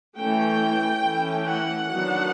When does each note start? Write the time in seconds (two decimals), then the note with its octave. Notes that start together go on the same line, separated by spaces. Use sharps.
0.17 E3 A3 C#4 G5
1.03 E3 A3 C#4
1.46 F#5
1.88 D#3 F#3 B3 D4